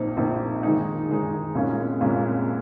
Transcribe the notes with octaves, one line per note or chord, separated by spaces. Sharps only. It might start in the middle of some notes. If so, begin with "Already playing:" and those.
Already playing: A#1 A#2 F3 C4 D#4
A#1 A#2 F3 C4 D#4
D#3 G#3 D#4
D#3 G#3 D#4
C2 A#2 G#3 C#4 F4
C2 A#2 G#3 C#4 F4